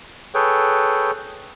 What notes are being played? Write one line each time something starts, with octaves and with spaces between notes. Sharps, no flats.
G#4 A4 B4 C#5 G5